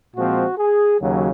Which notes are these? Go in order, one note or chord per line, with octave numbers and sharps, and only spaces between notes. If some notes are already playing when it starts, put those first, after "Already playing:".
A#2 F3 G#3 C4 F#4
G#4
D#2 C#3 F#3